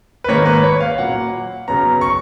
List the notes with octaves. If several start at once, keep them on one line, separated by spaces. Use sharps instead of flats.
B4
G#2 D#3 A#3 C#5
B4
C#5
F5
A#2 F#3 A#3 F#5
F#2 C#3 F#3 B3 A#5
C#6